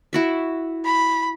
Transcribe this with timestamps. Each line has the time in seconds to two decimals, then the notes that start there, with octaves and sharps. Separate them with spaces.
0.13 E4 F#4 E5
0.85 B5